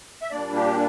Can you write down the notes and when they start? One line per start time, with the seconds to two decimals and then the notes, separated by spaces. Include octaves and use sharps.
0.22 E5
0.31 A#2 G3 A#3 D4 D5
0.56 G4